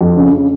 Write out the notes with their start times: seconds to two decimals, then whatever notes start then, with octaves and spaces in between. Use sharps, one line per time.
0.01 F2
0.17 C#3
0.33 C#3